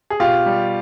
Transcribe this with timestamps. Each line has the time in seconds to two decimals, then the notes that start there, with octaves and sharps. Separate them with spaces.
0.10 G#4
0.20 B2 F4 G4
0.46 G3